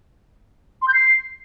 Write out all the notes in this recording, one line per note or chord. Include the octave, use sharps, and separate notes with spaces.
C6
G6
C7